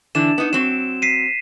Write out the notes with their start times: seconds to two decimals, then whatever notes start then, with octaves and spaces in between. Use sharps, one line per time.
0.15 D3 E3 D4 E7
0.38 B3 D#4
0.53 F#3 C4 E7
1.02 B6 C7 D#7